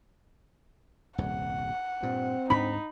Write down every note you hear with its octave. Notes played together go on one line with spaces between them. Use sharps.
D#1 C2 G2 F#5
G2 A#2 C4
D2 G#2 D4 D#4 B5